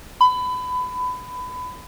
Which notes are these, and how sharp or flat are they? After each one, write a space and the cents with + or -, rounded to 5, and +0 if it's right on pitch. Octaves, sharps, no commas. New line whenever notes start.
B5 +25